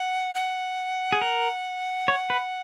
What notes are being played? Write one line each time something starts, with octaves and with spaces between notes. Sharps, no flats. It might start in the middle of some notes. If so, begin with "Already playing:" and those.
Already playing: F#5
F#5
G#4
A#4
C#5
B4